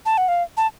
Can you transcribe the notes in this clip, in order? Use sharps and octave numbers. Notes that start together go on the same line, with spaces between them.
A5
F#5
F5
A5